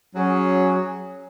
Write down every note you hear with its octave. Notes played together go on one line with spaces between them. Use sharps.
F#3 C#4 G#4